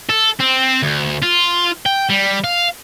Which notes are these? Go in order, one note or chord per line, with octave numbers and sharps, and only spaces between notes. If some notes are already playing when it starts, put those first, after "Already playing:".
A4
C4
D2
F4
G5
G3
F5